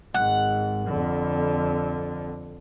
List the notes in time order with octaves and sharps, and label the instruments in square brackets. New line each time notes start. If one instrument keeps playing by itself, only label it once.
[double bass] G#1 G#2 [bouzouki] F#5
[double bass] F2 D3